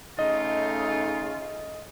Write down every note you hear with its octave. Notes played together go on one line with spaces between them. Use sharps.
C#3 A3 D#4 F4 D#5